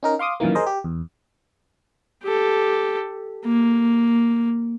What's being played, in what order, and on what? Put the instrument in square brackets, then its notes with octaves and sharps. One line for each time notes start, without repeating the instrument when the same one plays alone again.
[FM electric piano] C#4 D#4 A#4
F5 C6 D6 D#6
F#2 A#2 D#3 E3 A#3
G#4 A#4 C5 D#5
G4
E2
[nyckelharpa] G4 A4
A#3